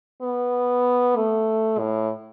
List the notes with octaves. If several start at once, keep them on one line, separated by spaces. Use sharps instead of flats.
B3
A3
A2